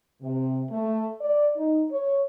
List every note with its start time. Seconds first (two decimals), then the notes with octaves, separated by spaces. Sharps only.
0.22 C3
0.71 A3
1.21 D5
1.57 D#4
1.91 C#5